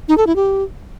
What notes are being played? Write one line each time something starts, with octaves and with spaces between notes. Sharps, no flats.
D#4
A4
E4
G4